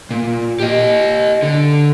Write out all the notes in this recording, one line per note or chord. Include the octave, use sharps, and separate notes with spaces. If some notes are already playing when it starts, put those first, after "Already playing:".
A#2
G4 D#5
D3